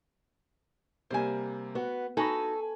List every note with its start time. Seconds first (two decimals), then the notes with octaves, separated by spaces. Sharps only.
1.10 C3 G3 A#3 C5 G#5
1.75 B3 F#4
2.17 D#4 F#4 A4 G#5 B5 C#6